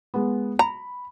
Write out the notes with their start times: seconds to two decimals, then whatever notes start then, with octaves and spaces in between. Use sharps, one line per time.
0.14 G#3 B3
0.59 A#5 B5